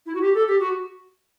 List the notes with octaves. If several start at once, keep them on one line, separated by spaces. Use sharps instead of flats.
E4
F#4
G4
A4
G4
F#4